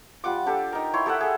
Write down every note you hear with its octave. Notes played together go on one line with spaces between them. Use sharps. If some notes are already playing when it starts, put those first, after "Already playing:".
G3 F4 F#5 D6
D4 G4 A4
D#4 A#4
E4 C#5 C6
G4 A4 E5 F#5
G#4 A4